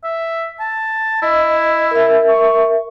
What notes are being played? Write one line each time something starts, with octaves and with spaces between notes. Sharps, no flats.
E5
A5
E4 D#5
A#4 E5
C#6